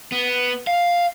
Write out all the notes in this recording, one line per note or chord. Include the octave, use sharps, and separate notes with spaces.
B3
F5